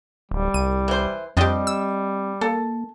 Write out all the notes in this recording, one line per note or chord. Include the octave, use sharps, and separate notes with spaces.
D1 G3
C2 D#7
E3 C5
F2 G3 C4 D4 G4 D#5 C6
E6
A#3 A4